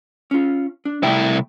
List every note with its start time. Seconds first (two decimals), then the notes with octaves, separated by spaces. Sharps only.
0.31 C#4 F4
0.85 D4
1.03 C2 A3 E4 G5